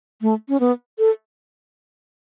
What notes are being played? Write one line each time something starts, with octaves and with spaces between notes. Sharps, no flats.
A3
C#4
B3
A4